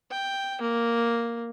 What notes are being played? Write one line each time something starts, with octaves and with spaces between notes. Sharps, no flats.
G5
A#3